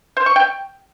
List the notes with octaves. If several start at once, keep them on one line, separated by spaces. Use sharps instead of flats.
C5
C#6
G5